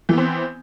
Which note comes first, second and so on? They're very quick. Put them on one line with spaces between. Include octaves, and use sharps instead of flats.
E3 B3 C4